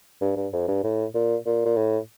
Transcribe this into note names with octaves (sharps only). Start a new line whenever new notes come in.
G2
G2
F2
G2
A2
A#2
A#2
A#2
A2